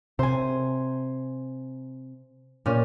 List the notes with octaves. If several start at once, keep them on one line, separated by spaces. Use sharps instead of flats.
C3 C5 G#5
A#2 C#4